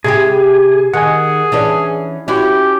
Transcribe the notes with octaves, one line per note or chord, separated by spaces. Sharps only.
C3 E4 G4 G#4
D#3 G#4 F#5 G#5
E3 C#4 D4
C#4 E4 F#4 G4